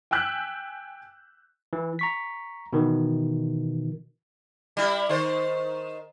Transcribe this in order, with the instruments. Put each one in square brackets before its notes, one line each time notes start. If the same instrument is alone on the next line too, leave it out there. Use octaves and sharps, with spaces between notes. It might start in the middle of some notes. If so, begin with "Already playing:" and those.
[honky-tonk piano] G5 G#5 E6 F#6 G6 B6
[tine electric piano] E3
A#5 C#6 B6
B2 D#3 E3
[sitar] G3 E4
D#3 C5